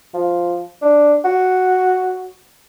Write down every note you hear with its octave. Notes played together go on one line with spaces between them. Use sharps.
F3
D4
F#4